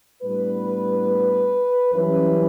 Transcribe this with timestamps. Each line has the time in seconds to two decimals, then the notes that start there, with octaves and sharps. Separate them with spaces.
0.22 A2 G3 B3 D4 B4
1.92 F#2 E3 G3 C#4 E4 B4